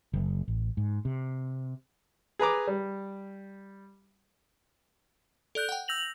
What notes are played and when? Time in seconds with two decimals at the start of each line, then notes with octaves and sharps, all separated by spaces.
0.13 F#1
0.48 A1
0.77 G#2
1.05 C3
2.39 G#4 B4 A#5 D6
2.67 G3
5.55 A4 D5 F#6 G6
5.69 F#5 G5
5.88 E6 G6 A#6 F7 F#7